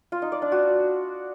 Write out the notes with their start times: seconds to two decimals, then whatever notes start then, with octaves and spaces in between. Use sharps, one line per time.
0.12 F4
0.22 D#4
0.32 D5
0.42 D4
0.52 F#4